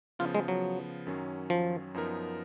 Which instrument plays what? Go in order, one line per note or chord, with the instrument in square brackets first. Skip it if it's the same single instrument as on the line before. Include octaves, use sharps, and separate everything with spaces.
[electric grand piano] C#3 F3 B3 [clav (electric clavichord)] F4
[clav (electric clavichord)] G#3
F#3
[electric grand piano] F#2 D#3 F#3 C#4
[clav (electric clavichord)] F3
[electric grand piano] F#2 F3 B3 D#4 A#4